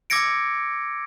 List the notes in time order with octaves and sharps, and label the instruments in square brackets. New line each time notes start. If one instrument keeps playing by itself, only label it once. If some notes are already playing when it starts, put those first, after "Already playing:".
[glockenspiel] D6 E6 G#6 A#6 C#7 D7